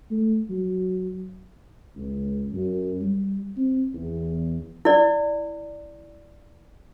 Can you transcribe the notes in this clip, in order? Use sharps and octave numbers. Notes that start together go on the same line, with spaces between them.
A3
F#3
C#2
F#2
G3
C4
E2
E4 D5